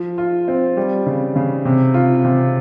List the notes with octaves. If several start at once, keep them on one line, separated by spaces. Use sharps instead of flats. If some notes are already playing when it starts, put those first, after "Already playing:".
Already playing: F3
F4
C4
G3
C#3
C#3
C3
F4
C3